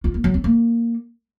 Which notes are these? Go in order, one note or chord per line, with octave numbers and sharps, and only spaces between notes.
F4
A#3
F#3
C4
A#3